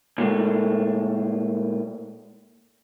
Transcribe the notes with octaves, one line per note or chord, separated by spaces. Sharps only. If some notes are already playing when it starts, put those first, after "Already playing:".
A#2 G#3 A3